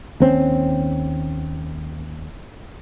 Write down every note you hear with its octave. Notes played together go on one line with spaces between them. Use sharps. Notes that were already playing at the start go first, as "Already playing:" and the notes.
D#2 C4 C#4